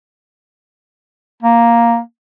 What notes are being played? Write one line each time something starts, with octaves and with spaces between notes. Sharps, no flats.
A#3